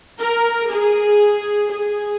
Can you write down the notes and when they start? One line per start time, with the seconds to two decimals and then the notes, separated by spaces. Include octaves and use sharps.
0.20 A#4
0.70 G#4
1.70 G#4